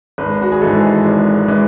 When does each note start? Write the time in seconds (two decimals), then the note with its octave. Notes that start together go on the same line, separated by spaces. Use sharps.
0.18 G#1 B4
0.42 F#4
0.52 G#4
0.62 G#2 E3 G#3 A4
1.05 G#1
1.48 E3 G#3